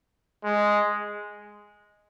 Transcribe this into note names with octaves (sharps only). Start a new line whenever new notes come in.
G#3